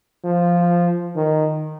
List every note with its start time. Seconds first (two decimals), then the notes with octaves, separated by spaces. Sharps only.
0.25 F3
1.16 D#3